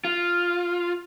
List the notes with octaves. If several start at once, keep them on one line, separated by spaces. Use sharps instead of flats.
F4